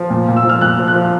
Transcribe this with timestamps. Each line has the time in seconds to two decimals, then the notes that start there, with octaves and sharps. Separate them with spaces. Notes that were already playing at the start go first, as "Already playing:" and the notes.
Already playing: F3
0.10 A#2
0.28 A#2
0.37 E6
0.44 F3 F6
0.61 A#2 F#6
0.79 F3
0.88 F#6
0.95 F3